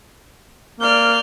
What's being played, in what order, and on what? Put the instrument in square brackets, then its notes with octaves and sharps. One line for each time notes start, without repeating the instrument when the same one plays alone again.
[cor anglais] A#3 [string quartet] D5 F6 G6